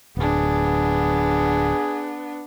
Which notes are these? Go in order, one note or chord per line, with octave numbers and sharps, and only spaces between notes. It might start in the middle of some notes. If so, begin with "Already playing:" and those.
D1 B3 D4 G#4